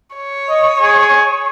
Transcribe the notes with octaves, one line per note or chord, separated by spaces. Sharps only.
C#5
D#5
G#4